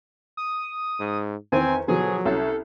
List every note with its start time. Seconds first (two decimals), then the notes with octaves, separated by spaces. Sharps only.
0.37 D#6
1.00 G#2
1.52 E2 D#3 C4 C5 G#5
1.88 B2 D3 F3 F#3 G#4
2.25 C2 C#4 A4